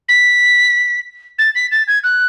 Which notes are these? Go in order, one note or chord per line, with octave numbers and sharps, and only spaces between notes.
B6
A6
B6
A6
G#6
F#6